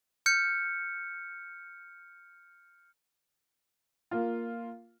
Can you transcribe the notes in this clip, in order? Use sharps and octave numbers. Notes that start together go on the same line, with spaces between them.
F6 G6 C#7
A#3 F4